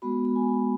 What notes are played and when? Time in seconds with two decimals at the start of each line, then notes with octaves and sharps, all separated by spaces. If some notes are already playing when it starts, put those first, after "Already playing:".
0.02 G#3 B3 F#4 B5
0.25 B5
0.36 G#5